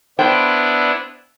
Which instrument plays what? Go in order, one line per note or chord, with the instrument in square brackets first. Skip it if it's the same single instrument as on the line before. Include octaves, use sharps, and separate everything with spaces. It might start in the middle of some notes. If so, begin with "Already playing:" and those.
[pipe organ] B3 D4 E4 [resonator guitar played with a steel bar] C5 G5